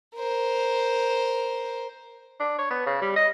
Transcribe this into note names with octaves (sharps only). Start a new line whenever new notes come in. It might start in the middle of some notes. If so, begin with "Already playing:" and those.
A#4 C5
D4
C#5
B3
C#3
G3
D#5